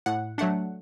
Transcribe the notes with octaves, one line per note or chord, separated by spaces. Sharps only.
A2 F#5
F#3 A3 D4 F#5